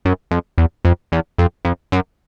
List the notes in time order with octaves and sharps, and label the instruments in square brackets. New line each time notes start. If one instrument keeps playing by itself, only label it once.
[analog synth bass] F#2
F2
E2
F2
E2
F2
F2
F#2